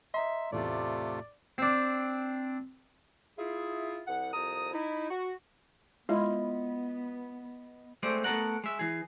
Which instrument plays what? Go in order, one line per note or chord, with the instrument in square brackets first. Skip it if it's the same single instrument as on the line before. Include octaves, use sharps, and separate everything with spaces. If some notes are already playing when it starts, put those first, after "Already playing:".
[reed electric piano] D#5 A#5 C6 [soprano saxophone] E5
[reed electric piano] E2 A2 [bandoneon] C3 A3 F4 [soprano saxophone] D5
[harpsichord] C4 D4
[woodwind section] E4 F4 G#4
C2 F#5
C2 F2 A#5 D#6
D#4 E4
F#4
[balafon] G#3 [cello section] B3 [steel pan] E4 F4 [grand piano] D#5
[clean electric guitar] G#3 A3 C4 C5 D5
A3 B3 A4 A#4 F#5
G#3 E5
E3 G#4